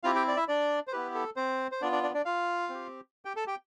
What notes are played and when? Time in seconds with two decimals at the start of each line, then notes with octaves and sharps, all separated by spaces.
0.03 C4 E4 F4 G4 F5
0.15 G4 G5
0.28 D5
0.37 E4 E5
0.48 D4 D5
0.87 C5
0.92 B3 E4 G4 B4
1.15 A4
1.36 C4 C5
1.72 C5
1.82 B3 D4 F4 D5
1.92 D4 D5
2.03 D4 D5
2.14 D4 D5
2.25 F4 F5
2.69 C4
2.74 G4
3.25 G4 G5
3.36 A4 A5
3.47 G4 G5